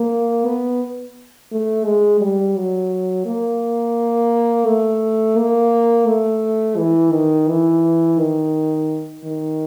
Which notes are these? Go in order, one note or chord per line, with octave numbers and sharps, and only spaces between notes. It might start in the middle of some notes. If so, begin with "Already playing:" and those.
Already playing: A#3
B3
A3
G#3
G3
F#3
A#3
A3
A#3
A3
E3
D#3
E3
D#3
D#3